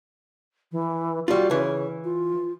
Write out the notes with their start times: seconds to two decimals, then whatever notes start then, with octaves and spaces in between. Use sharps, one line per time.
0.72 E3
1.28 G3 F4 F#4
1.51 C#3 E3
2.04 F4